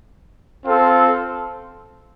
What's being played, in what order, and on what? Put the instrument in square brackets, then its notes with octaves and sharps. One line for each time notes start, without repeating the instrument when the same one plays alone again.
[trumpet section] C4 F4 A4